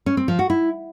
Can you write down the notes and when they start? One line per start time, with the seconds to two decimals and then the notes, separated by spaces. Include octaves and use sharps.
0.06 C#4
0.17 C4
0.28 F3
0.39 F#4
0.50 E4